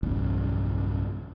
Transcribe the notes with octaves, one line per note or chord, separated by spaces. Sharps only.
B1 E2 G2 C#3